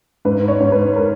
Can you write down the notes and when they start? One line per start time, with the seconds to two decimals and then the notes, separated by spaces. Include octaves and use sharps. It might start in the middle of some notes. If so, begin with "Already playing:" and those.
0.25 G#2 B4
0.48 C#5
0.60 G#2
0.72 B4
0.96 A#4